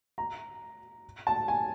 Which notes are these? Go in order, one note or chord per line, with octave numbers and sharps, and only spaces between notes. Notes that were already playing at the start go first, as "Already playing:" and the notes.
A#5
A5
G#5